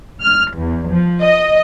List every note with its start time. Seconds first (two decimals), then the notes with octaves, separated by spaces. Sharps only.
0.21 F6
0.55 E2
0.90 F3
1.23 D#5